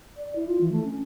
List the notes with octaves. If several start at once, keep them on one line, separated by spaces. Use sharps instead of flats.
D5
E4
F4
E3
A3
C#4